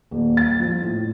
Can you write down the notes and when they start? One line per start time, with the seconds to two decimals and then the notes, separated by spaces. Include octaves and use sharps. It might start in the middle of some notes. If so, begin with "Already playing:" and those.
0.11 D#1
0.37 A6
0.60 F3
0.82 A2